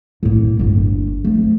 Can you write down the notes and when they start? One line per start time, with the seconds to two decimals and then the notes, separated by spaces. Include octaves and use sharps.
0.23 A2 A#3
0.59 G1 D2
1.24 F3 A3